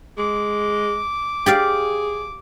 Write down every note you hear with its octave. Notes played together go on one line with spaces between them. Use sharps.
G#3 D6
G4 G#4 D5 F5